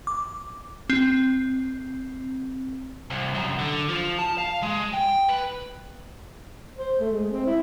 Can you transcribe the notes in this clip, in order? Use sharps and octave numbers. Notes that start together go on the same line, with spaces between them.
D6
C4
C2
F#2
D3
F3
A5
F5
G#3
G5
B4
C5
A3
G#3
C4
E4